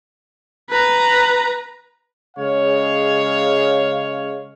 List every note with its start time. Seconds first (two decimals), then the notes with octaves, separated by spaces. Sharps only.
0.70 B4 A#5
2.37 C#3 G#3 C#5 F5